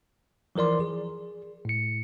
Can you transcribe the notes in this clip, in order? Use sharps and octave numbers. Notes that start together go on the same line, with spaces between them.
E3 F3 A#4 D5 C6
G#4
A2 C#7